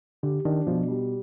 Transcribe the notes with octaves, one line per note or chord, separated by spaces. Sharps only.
D3 G4
D#3 D4
B2 F3
G3